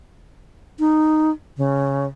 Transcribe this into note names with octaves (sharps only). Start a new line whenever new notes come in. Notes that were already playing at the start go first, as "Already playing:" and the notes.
D#4
C#3